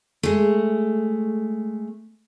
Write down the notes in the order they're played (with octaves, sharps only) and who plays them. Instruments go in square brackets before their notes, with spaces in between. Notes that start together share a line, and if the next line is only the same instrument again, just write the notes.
[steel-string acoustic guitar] G#3 A3